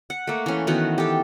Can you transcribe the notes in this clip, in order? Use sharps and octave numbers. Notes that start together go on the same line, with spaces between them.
F#5
A3 A#3
E3 C#4
D#3 E3 B3 F#4
G4 A4